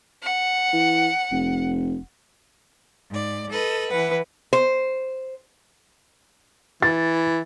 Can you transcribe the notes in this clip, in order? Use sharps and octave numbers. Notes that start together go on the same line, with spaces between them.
F#5
E3
F1
G#2 D5
A4 B4 D#5
E3 B4 F#5
C5
E3 A6